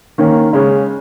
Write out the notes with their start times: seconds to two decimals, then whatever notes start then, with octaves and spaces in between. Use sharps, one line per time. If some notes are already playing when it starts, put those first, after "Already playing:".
0.18 D#3 A#3 C#4
0.53 C#3 G#3 C#4